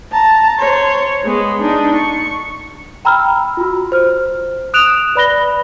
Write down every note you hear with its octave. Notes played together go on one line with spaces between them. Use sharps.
A5 A#5
C5 C#5
G#3 B3
D4 D#4
C#6
G5 A#5 B5 E6 F6
F4 F#4
C5 F6
D#6 F#6 D7 E7 F7
B4 D5 B5 F#6 A#6 G7